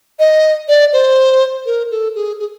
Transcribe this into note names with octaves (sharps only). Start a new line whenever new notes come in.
D#5
D5
C5
A#4
A4
G#4
G#4